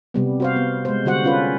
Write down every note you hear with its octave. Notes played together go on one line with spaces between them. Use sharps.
C3 G3 B3
F#4 C5 F5
B3
G#3 C5
D3 G3 F#4 C5 F#5
C#4 F4 B4